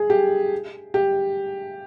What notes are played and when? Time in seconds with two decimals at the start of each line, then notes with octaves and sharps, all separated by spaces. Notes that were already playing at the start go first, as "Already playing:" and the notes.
Already playing: G#4
0.10 G4
0.94 G4